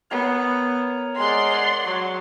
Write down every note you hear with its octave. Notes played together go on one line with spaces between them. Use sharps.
B3 A#4 C#5 A#5
G#3 D5 F#5 C6
F#3